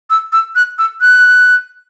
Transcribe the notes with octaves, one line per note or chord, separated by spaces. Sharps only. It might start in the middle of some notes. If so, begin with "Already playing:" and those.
E6
E6
F#6
E6
F#6